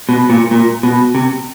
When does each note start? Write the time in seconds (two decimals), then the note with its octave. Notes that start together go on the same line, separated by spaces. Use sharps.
0.09 B2
0.30 A#2
0.51 A#2
0.83 B2
1.15 C3